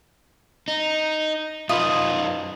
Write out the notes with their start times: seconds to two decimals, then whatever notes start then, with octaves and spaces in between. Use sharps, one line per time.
0.68 D#4
1.69 F#2 D#4 F4 B4 D#5 B5